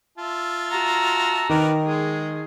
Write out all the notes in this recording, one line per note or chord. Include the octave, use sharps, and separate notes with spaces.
F4 E5 A5
F#4 A#5
D#3 A#4 B4 D5
G#3 G#4